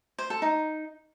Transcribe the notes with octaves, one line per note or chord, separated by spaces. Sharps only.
C5
A4
D#4